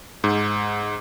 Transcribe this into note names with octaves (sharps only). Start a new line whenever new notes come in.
G#2